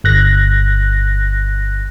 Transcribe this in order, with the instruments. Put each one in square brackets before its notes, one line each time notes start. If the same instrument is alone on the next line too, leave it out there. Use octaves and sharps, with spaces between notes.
[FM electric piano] G1 F#6 A#6